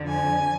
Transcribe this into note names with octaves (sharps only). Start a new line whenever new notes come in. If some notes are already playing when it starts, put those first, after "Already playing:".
Already playing: F2 D3 F3
G#5